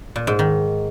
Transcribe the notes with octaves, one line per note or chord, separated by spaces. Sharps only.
A#2
G#2
D#3